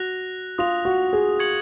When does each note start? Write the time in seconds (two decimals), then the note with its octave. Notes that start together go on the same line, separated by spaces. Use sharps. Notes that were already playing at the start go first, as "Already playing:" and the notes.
Already playing: F#4 F#6 A#6 F7
0.58 F4 D#6 A#6 F7
0.85 F#4
1.13 G#4
1.39 C#6 G#6 C#7 F#7